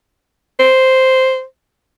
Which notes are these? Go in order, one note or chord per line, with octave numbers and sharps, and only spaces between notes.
C5